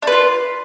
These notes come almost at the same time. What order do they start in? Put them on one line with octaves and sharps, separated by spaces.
D4 B4 F4